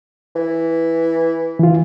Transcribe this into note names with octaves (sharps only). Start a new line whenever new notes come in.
E3
E3 F4